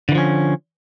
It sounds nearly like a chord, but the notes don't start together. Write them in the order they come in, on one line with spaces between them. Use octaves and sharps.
D3 E3 F3 C#4